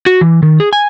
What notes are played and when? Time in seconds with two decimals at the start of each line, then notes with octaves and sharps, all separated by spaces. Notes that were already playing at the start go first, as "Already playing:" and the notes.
0.06 F#4
0.21 E3
0.43 D#3
0.60 G#4
0.73 G#5